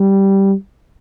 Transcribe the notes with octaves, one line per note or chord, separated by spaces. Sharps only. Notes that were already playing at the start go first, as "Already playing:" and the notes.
Already playing: G3